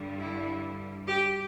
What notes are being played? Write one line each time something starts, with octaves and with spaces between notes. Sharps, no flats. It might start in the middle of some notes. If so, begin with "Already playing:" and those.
Already playing: G2 D3 G3
E4
G4